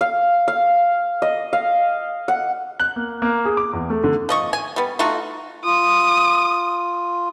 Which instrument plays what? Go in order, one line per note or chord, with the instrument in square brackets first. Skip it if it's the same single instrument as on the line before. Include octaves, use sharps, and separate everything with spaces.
[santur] F5
F5
D#5
F5
F#5
[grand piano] F#6
A#3
A#3
G#4
D6
E2
A3
D3
[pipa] F3 D#5 C#6
G#5
G3 B3
A3 D#4 F4 F#4
[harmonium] F4 [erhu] D#6